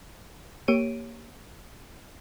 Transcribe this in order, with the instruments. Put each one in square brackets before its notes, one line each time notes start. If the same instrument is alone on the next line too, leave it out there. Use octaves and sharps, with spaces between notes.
[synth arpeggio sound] A#3 G4 C#5 D7 D#7